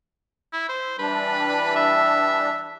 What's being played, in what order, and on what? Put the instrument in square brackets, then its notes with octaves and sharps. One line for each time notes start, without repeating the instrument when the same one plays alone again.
[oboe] E4
C5
[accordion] E3 G3 D4 [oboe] B4
[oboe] E5